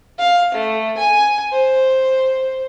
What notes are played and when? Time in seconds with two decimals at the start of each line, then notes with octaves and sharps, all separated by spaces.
0.19 F5
0.54 A3
0.98 G#5
1.52 C5